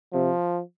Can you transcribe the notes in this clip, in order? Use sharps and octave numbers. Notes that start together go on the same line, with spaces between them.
C3 F3